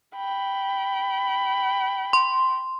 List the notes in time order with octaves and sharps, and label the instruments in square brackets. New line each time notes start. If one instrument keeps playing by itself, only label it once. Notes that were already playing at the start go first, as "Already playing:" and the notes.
[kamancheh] G5 B5
[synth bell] C6